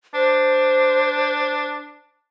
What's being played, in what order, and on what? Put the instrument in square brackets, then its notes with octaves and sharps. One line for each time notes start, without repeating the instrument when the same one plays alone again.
[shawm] D4 [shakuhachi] C5